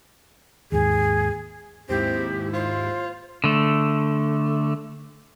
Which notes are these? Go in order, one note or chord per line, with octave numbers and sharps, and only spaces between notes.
D#2 G#2 G#4
D#2 G#2 C4 E4 G4
F4 C5
D3 A3